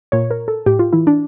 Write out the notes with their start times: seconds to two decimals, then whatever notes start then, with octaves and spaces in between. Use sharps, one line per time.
0.12 A#2 C#5
0.31 A#4
0.48 A4
0.66 A2 G4
0.79 F4
0.93 E3 E4
1.07 D4